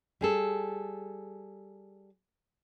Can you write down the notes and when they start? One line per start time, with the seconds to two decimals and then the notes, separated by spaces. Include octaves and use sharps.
0.21 G3 G#4 A4